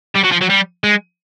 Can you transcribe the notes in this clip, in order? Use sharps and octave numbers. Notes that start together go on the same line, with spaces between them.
G3
F#3
F3
F#3
G3
G#3